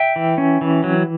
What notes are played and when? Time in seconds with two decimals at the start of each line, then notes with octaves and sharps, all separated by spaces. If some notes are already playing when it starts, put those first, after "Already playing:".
Already playing: E5 G5
0.16 E3
0.38 C#4
0.61 E3
0.84 F#3